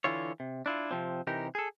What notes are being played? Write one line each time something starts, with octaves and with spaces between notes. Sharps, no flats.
D3 E3 E4 F4 C#5
C3
D4 E4 F4
C3 F3 C4
C3 E3 D#4 G4 A#4
G#4 A4